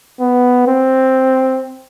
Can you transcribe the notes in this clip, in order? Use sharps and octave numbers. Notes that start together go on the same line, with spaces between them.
B3
C4